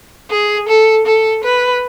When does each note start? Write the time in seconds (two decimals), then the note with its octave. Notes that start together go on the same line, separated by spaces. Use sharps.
0.31 G#4
0.68 A4
1.06 A4
1.44 B4